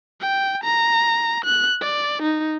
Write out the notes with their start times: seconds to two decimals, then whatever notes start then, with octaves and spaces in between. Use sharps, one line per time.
0.20 G5
0.64 A#5
1.45 F#6
1.81 D5
2.22 D#4